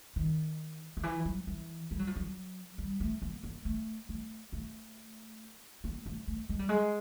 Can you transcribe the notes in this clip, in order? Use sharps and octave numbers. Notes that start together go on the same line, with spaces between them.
D#3
D#3
E3
F#3
E3
G3
F#3
F3
F#3
G3
A3
A#3
A#3
A3
A3
A3
A#3
A3
A3
G#3
G3
G#3